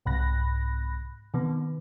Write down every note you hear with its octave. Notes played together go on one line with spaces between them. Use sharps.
C2 G#2 C3 B5 F#6 A#6
C3 D#3 B3